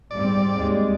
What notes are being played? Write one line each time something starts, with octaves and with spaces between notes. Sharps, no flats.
G#2 G3 C4 D5
D#2 G#3